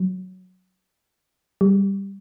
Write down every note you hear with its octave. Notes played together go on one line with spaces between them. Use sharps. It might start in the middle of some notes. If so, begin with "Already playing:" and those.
Already playing: F#3
G3